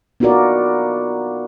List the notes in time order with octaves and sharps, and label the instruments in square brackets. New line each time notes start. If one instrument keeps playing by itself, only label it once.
[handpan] B3 D#4 F4 F#4 A#4 D5